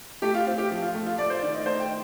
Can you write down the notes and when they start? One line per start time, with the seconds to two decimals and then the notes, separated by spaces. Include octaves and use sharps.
0.22 A3 G4
0.34 F4
0.46 C4 F4
0.58 G4
0.71 F3
0.82 F4
0.95 A3
1.06 F4
1.18 A3 D5
1.30 C5
1.42 D#3 D5
1.55 D#5
1.66 A3 C5
1.80 G5